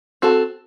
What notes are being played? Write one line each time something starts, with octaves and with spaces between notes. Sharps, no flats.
C4 F#4 A4